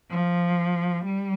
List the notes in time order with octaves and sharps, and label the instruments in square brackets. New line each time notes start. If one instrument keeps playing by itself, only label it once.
[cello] F3
G3